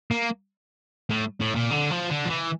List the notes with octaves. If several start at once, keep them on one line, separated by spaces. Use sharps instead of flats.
A#3
A2
A2
A#2
D3
F3
D3
F3
E3